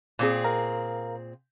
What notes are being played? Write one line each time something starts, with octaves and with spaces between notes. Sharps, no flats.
A#2 C4 G#4
A#4 F5 A#5